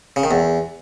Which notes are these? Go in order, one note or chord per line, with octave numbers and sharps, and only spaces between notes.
C#3
D#3
E2